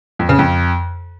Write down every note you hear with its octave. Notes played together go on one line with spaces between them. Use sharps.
F2
C#3
F2